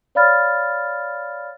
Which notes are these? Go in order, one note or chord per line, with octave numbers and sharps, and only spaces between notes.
C#5 D5 F5 B5 F6 A6